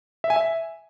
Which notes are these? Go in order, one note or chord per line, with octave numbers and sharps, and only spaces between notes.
E5
G#5
E5